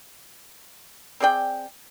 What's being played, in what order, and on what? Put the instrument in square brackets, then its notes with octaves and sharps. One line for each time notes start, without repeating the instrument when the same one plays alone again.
[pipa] C4 G#4 D5 G5